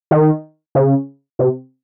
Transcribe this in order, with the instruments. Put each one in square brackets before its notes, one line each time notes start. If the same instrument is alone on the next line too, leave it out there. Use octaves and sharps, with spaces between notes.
[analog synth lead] D#3
C#3
C3